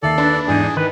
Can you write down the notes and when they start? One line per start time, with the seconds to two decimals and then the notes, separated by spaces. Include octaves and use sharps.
0.03 D#2 A4 D5 E5 C7
0.18 D4 B4
0.48 E2 G#2 D#4 E4 G#4
0.77 D#3 B4